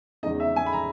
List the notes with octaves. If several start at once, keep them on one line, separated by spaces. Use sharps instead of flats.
E2 C#3 G#3 D#4 D#5
E5
G#5
B5
A#5